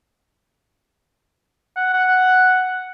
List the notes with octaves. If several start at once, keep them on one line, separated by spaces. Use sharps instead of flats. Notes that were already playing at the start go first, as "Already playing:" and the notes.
F#5
F#5